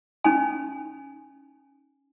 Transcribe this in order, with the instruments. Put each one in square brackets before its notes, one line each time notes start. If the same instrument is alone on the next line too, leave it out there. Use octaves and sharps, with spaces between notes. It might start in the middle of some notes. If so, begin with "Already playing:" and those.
[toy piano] C#4 D#4 G#5